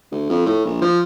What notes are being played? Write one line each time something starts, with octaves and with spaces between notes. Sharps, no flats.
D2
F2
A2
A#1
F3